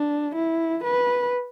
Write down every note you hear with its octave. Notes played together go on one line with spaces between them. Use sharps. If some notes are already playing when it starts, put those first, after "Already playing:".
Already playing: D4
E4
B4